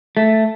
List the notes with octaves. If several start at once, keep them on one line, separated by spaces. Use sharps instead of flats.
A3